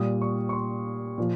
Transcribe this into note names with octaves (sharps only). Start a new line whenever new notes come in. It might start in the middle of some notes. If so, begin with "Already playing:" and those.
Already playing: A#2 G3 D#6
C#6
C#6
C6
A#2 F3